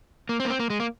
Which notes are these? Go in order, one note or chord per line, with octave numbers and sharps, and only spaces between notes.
A#3
C4
A#3
C4
A#3
G#3
A#3